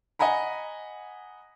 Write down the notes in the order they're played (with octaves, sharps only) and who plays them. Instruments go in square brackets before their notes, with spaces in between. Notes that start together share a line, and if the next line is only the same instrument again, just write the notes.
[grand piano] D#5 F#5 G#5 A#5 B5